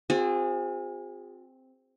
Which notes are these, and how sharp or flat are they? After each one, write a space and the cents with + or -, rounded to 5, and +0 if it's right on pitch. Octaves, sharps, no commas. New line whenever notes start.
C4 +0 F4 +45 G#4 -25